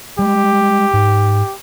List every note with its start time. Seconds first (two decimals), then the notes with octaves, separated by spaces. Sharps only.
0.19 G3 G#3 G4
0.94 G#2